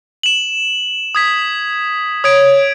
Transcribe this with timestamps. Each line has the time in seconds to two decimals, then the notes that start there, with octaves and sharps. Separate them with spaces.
0.23 E7 F#7
1.15 D#6 G#6 B6
2.24 C#5 D#6 G#6 D7